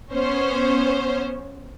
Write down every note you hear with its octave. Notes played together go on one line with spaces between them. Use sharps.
B3 C#4 C5 C#5